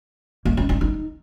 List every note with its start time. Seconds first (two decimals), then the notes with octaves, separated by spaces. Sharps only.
0.45 A#3
0.57 C#4
0.69 D4
0.81 D#4